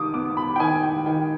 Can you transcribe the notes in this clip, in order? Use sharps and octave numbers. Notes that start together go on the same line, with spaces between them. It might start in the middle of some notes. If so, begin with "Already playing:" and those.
Already playing: D#3 D6 D#6
B3 D6
B5
G5
D#3 G#5
G5
D#3 G5